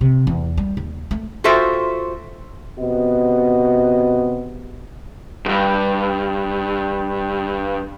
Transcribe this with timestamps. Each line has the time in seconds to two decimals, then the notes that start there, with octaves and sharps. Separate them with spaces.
0.01 C3
0.27 E2
0.57 G3
0.77 D#2
1.11 A3
1.44 F4 F#4 A4 C5 E5 G5
2.79 C3 B3 F#4 D#5
5.46 E2 G2